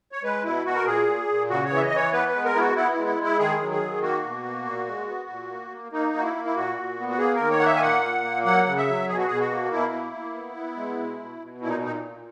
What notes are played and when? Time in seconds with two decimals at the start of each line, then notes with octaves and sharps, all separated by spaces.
0.12 C#5
0.23 G#3 B4
0.44 B2 E4
0.65 B2 F#4
0.76 A#4
0.86 A#2 G#4
1.07 A#2
1.28 A#2
1.50 C#3 F#4
1.65 C#5
1.70 E3
1.77 E5
1.82 D#5
1.91 E3
1.96 C#5
2.13 B3 B4
2.28 B4
2.34 G#3
2.44 A#4
2.55 B3 E4
2.60 F#4
2.75 B3 E4
2.91 E4
2.96 G#3
3.08 E4
3.18 G#3 E4
3.39 D#3 G#4
3.60 F#3
3.71 G#4
3.82 D#3
4.02 A#3 F#4
4.23 B2
4.45 A#3
4.66 A#2
4.87 G#3
5.08 B3
5.29 A#2
5.50 A#3
5.70 A#3
5.92 A#3 D#4
6.13 A#3 F#4
6.24 E4
6.35 A#3
6.45 E4
6.56 A#2 F#4
6.77 A#2
6.98 B3
7.09 F#4
7.18 A#3 G#4
7.35 D#3 A#4
7.51 C#5
7.60 A#3 F#5
7.66 E5
7.76 G#5
7.81 A#2 F#5
8.03 A#2
8.24 A#3
8.45 F#3 F#5
8.66 C#3
8.77 E5
8.87 F#3
9.08 B2 G#4
9.18 F#4
9.27 B2 G#4
9.40 F#4
9.50 A#3
9.71 B2 E4
9.93 A#3
10.13 A#3
10.34 B3
10.56 B3
10.77 G#3
10.98 B2
11.19 B2
11.40 B2
11.61 A#2 E4
11.69 D#4
11.82 A#2 D#4
12.04 A#2